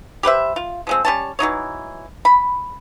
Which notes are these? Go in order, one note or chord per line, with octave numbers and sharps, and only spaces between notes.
G4 B4 C5 E5
F4
F3 G#3 C4
G3 C#4 A5
E3 F#3 D#4 C#5
B5